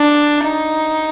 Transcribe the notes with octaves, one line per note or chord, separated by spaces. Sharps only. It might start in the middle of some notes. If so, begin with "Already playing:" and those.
Already playing: D4
D#4